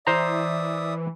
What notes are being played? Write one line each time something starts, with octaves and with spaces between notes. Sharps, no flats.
E3 C5 D5 E5 A#5 D#6